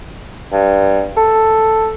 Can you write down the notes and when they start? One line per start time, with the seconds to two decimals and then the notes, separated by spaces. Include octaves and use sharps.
0.52 G2
1.17 A4